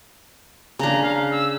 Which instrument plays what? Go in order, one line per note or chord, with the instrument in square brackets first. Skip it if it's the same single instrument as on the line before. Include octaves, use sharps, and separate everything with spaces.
[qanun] C#3 D4 [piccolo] A#5
[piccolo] F5
E6